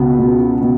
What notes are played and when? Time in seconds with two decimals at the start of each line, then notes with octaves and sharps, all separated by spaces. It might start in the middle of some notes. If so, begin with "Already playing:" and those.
Already playing: C#2 B2 B3
0.19 B2
0.62 B2